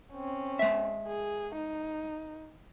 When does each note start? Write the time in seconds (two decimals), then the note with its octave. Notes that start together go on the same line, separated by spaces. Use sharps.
0.14 C4 C#4
0.59 G#3 E5
1.07 G#4
1.55 D#4